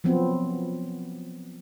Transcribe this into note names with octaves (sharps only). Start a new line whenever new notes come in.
F3 F#3 B3 C4